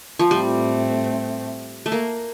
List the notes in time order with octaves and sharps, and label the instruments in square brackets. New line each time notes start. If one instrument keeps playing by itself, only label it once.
[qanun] F3
[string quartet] A2 A3 C4 [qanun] G3
[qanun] A3
A#3